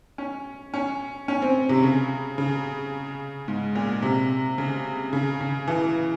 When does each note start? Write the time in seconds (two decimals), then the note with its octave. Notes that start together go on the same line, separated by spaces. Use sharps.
0.18 C#4
0.74 C#4
1.28 C#4
1.42 C4
1.69 C3
1.83 C#3
2.38 C#3
3.48 G#2
3.75 A#2
4.02 C3
4.58 C#3
5.13 C#3
5.41 C#3
5.68 E3